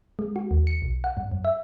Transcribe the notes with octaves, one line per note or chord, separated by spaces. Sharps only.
G#3
F#4
D#2
C#7
B1
F#5
G2
F#2
E5